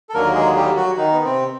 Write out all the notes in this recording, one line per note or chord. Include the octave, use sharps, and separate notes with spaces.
A4
D#2 D3 F#3 A#3 A#4
G#3 G#4
G3 G4
F#3 F#4
D#3 D#4
B3
C3 C4